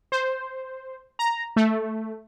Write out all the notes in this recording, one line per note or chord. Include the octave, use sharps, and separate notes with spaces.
C5
A#5
A3